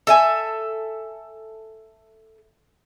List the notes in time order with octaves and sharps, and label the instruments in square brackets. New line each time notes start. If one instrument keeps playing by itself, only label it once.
[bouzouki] A4 E5 G#5